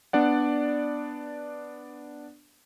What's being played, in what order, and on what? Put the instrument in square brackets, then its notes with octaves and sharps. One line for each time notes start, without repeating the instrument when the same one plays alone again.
[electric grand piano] B3 D4 D5 F#5